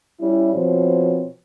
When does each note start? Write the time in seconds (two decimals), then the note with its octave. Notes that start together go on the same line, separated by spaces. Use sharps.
0.21 G3 C#4 E4
0.54 B2 F3 C4 C5 C#5